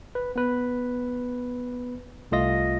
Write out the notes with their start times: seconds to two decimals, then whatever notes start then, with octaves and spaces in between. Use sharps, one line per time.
0.15 B4
0.36 B3 B4
2.31 C2 A3 F4 D#5 A#6